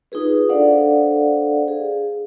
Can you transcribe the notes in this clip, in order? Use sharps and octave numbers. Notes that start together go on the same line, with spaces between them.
D#4 F4 G#4 B4
D4 A4 C5 D5 F5 F#5
G#4